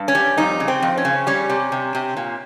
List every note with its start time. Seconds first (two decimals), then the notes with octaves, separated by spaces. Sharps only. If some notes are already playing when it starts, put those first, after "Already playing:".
Already playing: G2
0.08 C#4
0.15 G3
0.38 F2 D#4
0.60 C#3
0.68 C4
0.82 F2
0.98 C#4
1.05 C#3
1.27 G3 C#4
1.50 C3
1.72 C3
1.95 C3
2.17 A#2